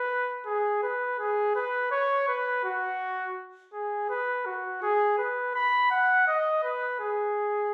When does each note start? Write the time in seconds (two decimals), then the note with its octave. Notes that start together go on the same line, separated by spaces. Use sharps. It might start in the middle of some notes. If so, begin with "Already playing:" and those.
Already playing: B4
0.46 G#4
0.83 B4
1.19 G#4
1.56 B4
1.92 C#5
2.28 B4
2.64 F#4
3.73 G#4
4.10 B4
4.46 F#4
4.83 G#4
5.18 B4
5.55 B5
5.91 F#5
6.28 D#5
6.64 B4
7.00 G#4